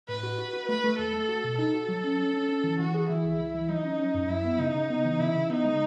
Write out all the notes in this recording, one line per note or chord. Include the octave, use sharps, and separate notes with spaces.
A2 B4
F#4
F#4
F#4
A3 B4
A3
D#2 A4
A3
F#4
B2
D#4 A4
F#4
F#3
C#4
C#4
C#4
C#4
E3
E3 F#4
G#4
E3 E4
C#2
C#2
E3
F#3 D#4
C#4
C#4
F#2
F#3 E4
B3
C#3 D#4
C#3
B3
E3
C#3 E4
C#3
B3 D#4
G#3